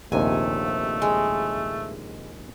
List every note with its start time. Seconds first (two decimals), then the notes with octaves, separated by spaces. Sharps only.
0.12 A#1 D#2 C3 A3 G#5
1.02 G#3